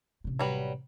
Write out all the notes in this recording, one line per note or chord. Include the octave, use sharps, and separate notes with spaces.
A1 C3
F#3 G3 B4